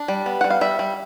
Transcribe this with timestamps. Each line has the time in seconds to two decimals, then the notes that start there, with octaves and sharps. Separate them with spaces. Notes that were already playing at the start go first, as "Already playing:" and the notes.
Already playing: D4
0.08 G3
0.26 B3
0.41 G3 F#5
0.50 F5
0.61 G3 E5
0.79 G3